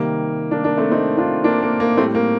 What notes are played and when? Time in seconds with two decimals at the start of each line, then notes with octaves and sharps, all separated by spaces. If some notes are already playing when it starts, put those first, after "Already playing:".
Already playing: C3 D#3 G3 A#3
0.51 A#3 D4
0.64 A#3 D4
0.77 A3 C4
0.91 C4 D#4
1.17 D4 F4
1.44 A#3 D4
1.63 A#3
1.80 A#3
1.97 A2 G3 A3 C4
2.15 A#3